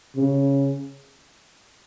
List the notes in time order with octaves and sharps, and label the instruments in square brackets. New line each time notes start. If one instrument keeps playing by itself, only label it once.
[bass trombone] C#3